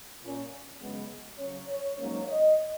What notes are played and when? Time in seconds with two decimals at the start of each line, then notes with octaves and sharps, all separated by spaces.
0.21 A#2 A#3 C#4
0.80 F#2 C#3 G#3 B3
1.38 C#3 F#3 C#4 C#5
1.68 C#5
1.97 G#2 F#3 A#3 C#4 C#5
2.27 D#5